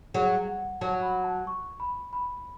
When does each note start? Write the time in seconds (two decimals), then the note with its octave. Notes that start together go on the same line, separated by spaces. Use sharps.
0.14 F#3 G#4
0.48 F#5
0.81 F#3 A5
1.02 B5
1.24 A5
1.47 C#6
1.80 B5
2.13 B5